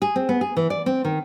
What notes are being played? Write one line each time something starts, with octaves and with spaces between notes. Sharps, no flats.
G#4
C4
B3
G#4
E3
D5
C4
D#3